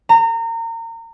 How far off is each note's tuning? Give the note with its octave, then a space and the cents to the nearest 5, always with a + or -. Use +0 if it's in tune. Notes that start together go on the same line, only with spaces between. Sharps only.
A#5 -30